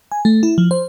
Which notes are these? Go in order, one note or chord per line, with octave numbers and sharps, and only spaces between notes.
G#5
A3
E4
F3
C5